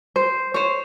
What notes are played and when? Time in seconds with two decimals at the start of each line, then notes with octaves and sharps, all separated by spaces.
0.16 C5
0.54 C5 C#5